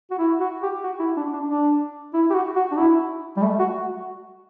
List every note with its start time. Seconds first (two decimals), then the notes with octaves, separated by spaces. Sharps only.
0.11 F#4
0.19 E4
0.40 F#4
0.63 G4
0.84 F#4
0.99 E4
1.17 D4
1.33 D4
1.49 D4
2.14 E4
2.30 G4
2.34 F#4
2.56 F#4
2.71 D4
2.78 E4
3.37 G3
3.42 A3
3.59 F#4